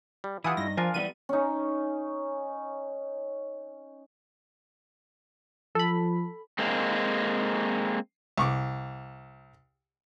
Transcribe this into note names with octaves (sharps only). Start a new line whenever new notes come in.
G3
E3 E4 F4 G4 F#5 G#5 D#6
G2 D#4 A#6
F3 D4 F4 A#4 G#5
E3 G3 B3 D#7
C#4 D#4
F3 A4 B5
G#3 A#3 C4
C2 C#6 D6